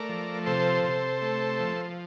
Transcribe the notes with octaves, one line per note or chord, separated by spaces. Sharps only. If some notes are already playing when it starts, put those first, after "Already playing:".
Already playing: A3 A#4 D5
F3
C3 A4 C5
C3
A3
F3